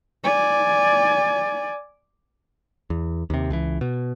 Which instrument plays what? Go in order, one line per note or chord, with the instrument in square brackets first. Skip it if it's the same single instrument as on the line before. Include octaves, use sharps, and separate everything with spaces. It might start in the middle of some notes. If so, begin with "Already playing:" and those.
[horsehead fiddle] D5 G#5
[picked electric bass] E2
D#2 C3
C#2 E3
B2